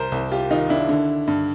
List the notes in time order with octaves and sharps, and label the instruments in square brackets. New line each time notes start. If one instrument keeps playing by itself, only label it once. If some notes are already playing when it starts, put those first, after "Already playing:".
Already playing: [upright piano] C2 A#4 C5
C2
F4 G4
D#3 D#4 F4
D4 E4
D3
G2